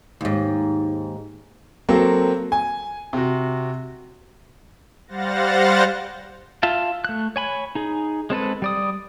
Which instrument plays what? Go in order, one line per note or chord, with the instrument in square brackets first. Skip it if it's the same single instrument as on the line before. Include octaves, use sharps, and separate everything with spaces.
[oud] D#2 G#2
[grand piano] F#3 A#3 C4 A4
G#5
C3 F#4
[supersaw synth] G3 C5 F5 F#5 A6 A#6
[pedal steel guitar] F4 E5 F5 A5
A3 F#6
C#5 G#5 B5
D#4 G#4
G#3 C4 A4 B4
G3 D5 D#6